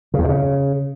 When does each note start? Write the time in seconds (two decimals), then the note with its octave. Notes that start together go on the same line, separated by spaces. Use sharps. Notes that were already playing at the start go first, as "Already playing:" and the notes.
0.14 C#3
0.19 E2
0.24 A#2
0.29 C#3